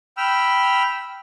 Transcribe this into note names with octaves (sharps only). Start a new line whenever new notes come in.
G5 B5 E6 F6